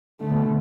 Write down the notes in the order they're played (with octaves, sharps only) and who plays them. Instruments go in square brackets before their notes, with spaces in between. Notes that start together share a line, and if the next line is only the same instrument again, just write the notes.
[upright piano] D3 [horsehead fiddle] A3
[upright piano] B2
D3